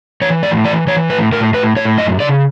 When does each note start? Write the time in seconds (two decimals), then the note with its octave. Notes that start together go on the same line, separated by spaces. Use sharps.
0.21 E3 C#5
0.43 A2 D5
0.65 E3 D5
0.87 E3 C#5
1.10 A2 B4
1.32 A2 A#4
1.54 A2 B4
1.76 A2 C#5
1.98 F#2 D#5
2.20 C#3 D5